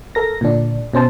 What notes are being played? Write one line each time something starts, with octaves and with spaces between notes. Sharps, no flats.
A4 A#4 A#6
A#2 D3 D4
B2 C#4 C5 A5